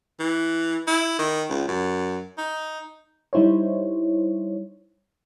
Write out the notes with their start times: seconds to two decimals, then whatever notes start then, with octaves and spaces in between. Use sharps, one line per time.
0.20 E3
0.87 E4
1.19 D#3
1.50 C#2
1.68 F#2
2.38 D#4
3.33 G3 D#4 E4 C5 C#5